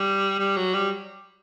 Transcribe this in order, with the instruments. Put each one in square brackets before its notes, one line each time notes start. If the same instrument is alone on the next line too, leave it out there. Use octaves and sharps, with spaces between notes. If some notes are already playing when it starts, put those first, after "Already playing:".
Already playing: [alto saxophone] G3
G3
F#3
G3